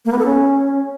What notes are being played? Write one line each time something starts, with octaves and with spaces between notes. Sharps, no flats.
A#3
B3
A4
C#4